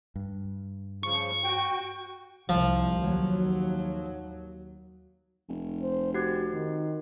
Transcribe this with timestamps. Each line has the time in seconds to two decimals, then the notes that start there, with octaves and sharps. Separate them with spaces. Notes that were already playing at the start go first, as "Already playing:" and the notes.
0.16 G2
1.03 C#3 F3 C#6
1.44 F#4 G5
2.49 C2 F3
2.98 D#2 F#3
5.49 F1
5.82 C5
6.15 C4 F#4 G4
6.53 D#3